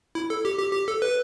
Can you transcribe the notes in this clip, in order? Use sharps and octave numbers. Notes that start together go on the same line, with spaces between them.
E4
A4
G4
G4
G4
A4
B4